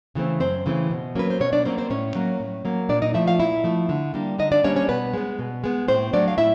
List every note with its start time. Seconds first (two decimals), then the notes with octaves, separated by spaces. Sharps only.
0.15 C#3 E3 A3 C4
0.40 F#2 C4 C5
0.66 C#3 E3 A3 C4
0.91 B2
1.15 F#3 A#3 C#4 B4
1.30 C5
1.40 B2 C#4 C#5
1.53 D4 D5
1.65 F#3 A#3 C4 C#4 C5
1.78 C4 C5
1.90 A2 C#4 C#5
2.15 F#3 A#3
2.40 A2
2.65 F#3 A#3
2.89 A#2 D4 D5
3.02 D#4 D#5
3.14 F3 A3 E4 E5
3.27 F4 F5
3.40 A#2 E4 E5
3.64 F3 A3
3.89 D3
4.14 G3 A#3 D4
4.38 D3 D#4 D#5
4.52 D4 D5
4.64 G3 A#3 C#4 D4 C#5
4.76 C#4 C#5
4.88 B2 B3 B4
5.13 G#3 B3
5.39 B2
5.64 G#3 B3
5.88 A2 C4 C5
6.13 F#3 A3 D4 D5
6.28 F5
6.38 A2 E4 E5